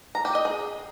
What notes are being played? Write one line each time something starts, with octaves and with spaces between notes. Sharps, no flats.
A#5
G4
D#5
G#4